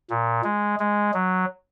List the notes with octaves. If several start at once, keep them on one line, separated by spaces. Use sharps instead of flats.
A#2
G#3
G#3
F#3